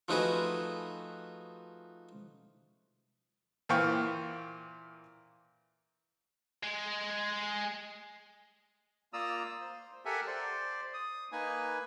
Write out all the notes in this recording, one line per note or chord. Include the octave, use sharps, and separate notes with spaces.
F3 A3 D#4 F#4 G#4 B4
A#2 E3 C5 F5 G5 C#6
G#3
A#3 F4 D5 A#5 D#6 E6
C5
G4 A4 A#4 E5 F#5 G#5
C5 D5
D#6
A#3 D#4 B4 G#5